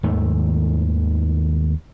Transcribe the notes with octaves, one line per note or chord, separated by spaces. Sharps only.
D#2 G#2 D#3 A3